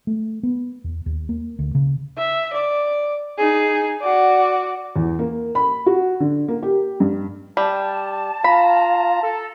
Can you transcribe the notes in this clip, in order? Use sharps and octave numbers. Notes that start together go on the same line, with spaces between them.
A3
B3
E2
D#2
A#3
D2
C#3
E5
D5
D#4 G#4
F#4 D5
E2
A#3
B5
F#4
D3
A#3
G4
G2
G3 A5
F4 F5 A#5 B5
A4